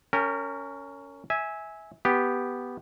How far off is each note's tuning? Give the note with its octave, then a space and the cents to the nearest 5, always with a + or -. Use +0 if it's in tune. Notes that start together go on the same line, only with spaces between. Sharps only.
C#4 +10 A#4 -25 G5 +0
E5 -20 G#5 +0
B3 +0 G4 +0